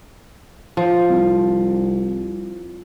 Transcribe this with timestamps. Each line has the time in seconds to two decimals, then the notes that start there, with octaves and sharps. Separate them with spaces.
0.77 F3
1.09 C2